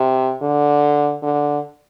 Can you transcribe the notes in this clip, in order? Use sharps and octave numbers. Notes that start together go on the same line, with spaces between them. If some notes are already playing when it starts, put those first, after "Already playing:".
Already playing: C3
D3
D3